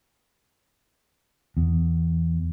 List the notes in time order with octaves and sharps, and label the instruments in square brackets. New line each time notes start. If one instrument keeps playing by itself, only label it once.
[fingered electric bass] E2